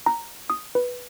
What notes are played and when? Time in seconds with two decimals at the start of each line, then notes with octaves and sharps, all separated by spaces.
0.06 A#5
0.50 D#6
0.75 B4